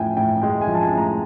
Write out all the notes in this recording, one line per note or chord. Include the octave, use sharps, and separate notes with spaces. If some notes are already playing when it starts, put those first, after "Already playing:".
Already playing: A2 F3 G5 G#5
A2 G5
G#3 G5
G#5
F3
A5
G#5
A2
A#5